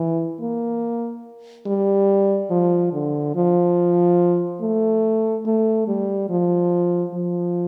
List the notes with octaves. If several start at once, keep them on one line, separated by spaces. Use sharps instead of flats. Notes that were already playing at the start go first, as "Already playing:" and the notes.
Already playing: E3
A#3
G3
F3
D3
F3
A3
A3
G3
F3
F3